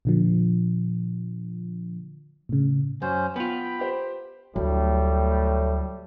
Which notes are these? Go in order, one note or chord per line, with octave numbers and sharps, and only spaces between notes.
A#2 D3 F3
A2 C#3
F#2 C#4 C5
B3 F4 G5 B5
G4 C5
D2 A2 F#3 G3